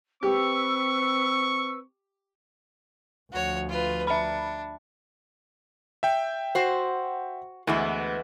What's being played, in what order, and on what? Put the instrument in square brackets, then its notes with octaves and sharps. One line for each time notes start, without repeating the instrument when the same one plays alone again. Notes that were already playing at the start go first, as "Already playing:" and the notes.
[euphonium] C4 [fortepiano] G4 [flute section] B4 E6 [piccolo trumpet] C#6
[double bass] D2 F3 [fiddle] F#4 C#5
[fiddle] F4 B4
[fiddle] D4 [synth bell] E5 B5
[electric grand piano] E5 G5
[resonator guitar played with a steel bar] F#4 C5
[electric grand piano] D2 [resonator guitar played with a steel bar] E3 G#3 B3